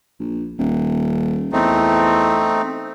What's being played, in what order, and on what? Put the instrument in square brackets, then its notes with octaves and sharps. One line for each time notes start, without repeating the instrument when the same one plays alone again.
[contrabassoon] A#1
D#1
[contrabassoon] E2 [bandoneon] A3 C4 D#4